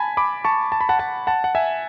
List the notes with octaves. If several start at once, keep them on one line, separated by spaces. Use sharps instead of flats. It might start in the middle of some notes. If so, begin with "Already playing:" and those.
Already playing: G#5 A5 B5
B5 D6
A5 C#6
A5
B5
F#5 A5
F#5 A5
F#5 A5
F#5
E5 G#5